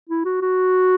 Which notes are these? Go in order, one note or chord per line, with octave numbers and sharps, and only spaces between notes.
E4
F#4
F#4